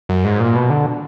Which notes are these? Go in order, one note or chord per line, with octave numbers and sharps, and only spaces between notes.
F#2
G#2
A#2
B2
D3